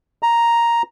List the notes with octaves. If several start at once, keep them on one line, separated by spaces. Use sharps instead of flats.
A#5